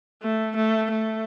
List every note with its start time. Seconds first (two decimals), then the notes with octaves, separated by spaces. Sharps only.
0.23 A3
0.56 A3
0.91 A3